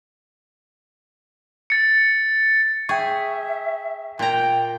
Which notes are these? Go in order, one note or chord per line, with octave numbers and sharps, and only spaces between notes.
A6 C#7
G#4 E5 G5 C#6
A#2 G5 A#5